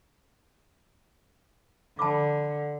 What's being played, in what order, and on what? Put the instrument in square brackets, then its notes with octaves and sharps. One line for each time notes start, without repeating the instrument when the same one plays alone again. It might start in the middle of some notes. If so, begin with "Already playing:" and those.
[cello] D3 [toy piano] A5 B5 D6